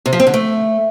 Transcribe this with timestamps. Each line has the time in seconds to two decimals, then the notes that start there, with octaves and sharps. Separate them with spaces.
0.06 C3
0.13 F3
0.20 C4
0.27 D3
0.34 A3